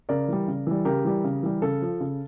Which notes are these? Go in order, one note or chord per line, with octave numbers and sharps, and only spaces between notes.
C#3 A#4 D5
E3 G3
C#3
E3 G3
C#3 G4 A#4
E3 G3
C#3
E3 G3
C#3 A4
F3
C#3